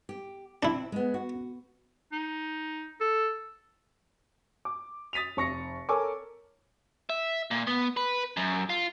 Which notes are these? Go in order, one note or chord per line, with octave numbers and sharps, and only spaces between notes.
G4
C4 D4 E4
G#3 B3
F#4
D#4
A4
D6
D#6 A6 B6 D#7 F7
F1 C#6 A#6 C#7
A4 A#4 C#5 G#5 C#6 D6
E5
A#2
B3
B4
F#2
F4